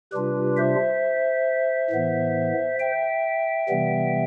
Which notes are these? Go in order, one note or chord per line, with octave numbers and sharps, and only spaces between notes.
C3 G3 D4 F4 G4 B4
C5 E5
A2 E3 B3
E5 G5
C3 E3 G3 B3